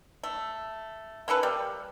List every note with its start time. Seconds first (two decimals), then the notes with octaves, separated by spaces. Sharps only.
0.23 A3
1.28 A#3 C#4 A4 B4
1.43 G3 A#3